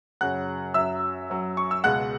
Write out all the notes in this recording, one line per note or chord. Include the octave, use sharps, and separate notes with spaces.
F#2 C#3 F#3 F#5 F#6
F#2 F#3 E5 E6
F#2 F#3
C#6
E6
C#2 B2 G#3 F#5 F#6